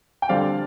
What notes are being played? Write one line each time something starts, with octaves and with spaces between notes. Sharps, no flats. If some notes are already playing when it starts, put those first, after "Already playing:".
G5
G2 D3 G3 C4 D5 F5